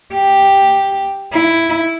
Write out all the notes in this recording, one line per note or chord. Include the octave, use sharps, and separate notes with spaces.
G4
E4